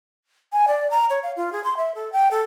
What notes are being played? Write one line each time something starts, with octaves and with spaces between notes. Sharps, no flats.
G#5
D5
A#5
C#5
F5
F4
G#4
C6
E5
A4
G5
A4